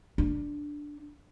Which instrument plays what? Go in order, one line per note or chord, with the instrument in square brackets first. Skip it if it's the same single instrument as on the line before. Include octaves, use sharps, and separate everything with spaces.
[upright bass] D4